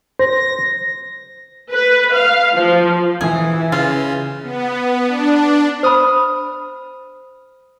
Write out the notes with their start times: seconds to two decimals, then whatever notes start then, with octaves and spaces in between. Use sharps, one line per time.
0.19 C5 A#6
1.72 B4
2.14 F5
2.54 F3
3.21 E3 G#4
3.72 C#3 F4
4.43 B3
5.07 D4
5.83 C5 B5 D#6 F6